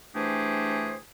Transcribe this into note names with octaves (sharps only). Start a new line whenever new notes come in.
E3 A3 D4 G4 G#4 C5